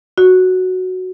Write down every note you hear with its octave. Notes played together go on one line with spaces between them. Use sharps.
F#4